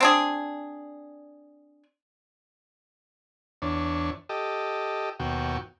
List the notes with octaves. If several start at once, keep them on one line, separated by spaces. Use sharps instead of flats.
C4 D4 G#4
E2 D4 C#5
G4 A4 D#5
D#2 B2 F#4 G5